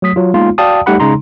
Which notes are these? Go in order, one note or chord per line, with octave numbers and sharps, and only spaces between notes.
F#3 A3 D#6 B6
F#3 F4
G#3 A#3 B3 D#4 F4
F#4 D5 F5 G5 A5 D#6
G3 A3 D#4 G4 F#5 B5
C#3 G#3 D#4 A#5 C6